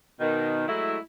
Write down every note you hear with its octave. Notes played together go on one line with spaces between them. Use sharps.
B2 D#3
F#3 G#3 A3 E4